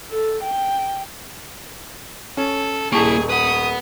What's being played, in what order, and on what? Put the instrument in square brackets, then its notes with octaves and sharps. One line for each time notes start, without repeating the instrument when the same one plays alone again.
[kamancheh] A4
G5
[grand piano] C#4 [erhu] A4
[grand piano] D#1 A5 C#6 [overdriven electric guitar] A#3 E4 [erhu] G#4
[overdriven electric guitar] B4 F#5 [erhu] D#6